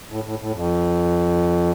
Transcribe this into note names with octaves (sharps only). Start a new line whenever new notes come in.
A2
A2
A2
F2